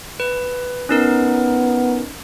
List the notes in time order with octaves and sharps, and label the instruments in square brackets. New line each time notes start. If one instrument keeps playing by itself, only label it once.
[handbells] B4
[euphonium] B3 [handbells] C#4 D#4 A#4